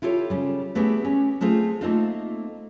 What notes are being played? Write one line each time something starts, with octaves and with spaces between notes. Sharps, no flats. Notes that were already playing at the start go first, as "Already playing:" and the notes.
E4 F4 G4 A4 C#5
C#3 G3
A3 B3 C4 E4 G4 G#4
C#4
G#3 A3 C4 F4 G#4
A3 A#3 C4 D#4 F4 A4